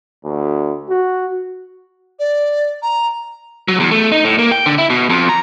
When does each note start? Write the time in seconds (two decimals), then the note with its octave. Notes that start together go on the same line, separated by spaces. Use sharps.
0.24 D2
0.89 F#4
2.19 D5
2.82 A#5
3.68 F#3
3.80 E2
3.91 A3
4.12 D#4
4.24 A2
4.39 A#3
4.51 G5
4.66 D3
4.78 E4
4.90 B2
5.10 F2
5.29 A#5